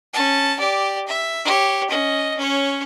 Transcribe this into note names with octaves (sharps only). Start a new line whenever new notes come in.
C#4 A5
G4 D5
E5
G4 C#5
C#4 D#5
C#4 C#5